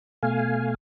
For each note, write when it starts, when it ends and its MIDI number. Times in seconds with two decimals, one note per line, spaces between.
0.23 0.74 47
0.23 0.74 57
0.23 0.74 77
0.23 0.74 80